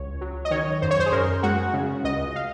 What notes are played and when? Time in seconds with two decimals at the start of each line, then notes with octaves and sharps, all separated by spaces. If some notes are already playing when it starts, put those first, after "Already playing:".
Already playing: C#2 C#5
0.21 F#3
0.45 D#5
0.51 D#3 C#5
0.82 F#2 C5
0.91 C#5
1.00 C5
1.06 G#4
1.12 F#2 A#4
1.43 G#3 F#4
1.74 C#3
2.04 C#2 D#5
2.36 F5